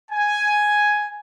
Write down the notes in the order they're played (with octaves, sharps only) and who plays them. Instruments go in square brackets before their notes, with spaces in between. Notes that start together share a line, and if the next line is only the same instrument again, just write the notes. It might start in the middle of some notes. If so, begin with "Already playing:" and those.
[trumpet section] G#5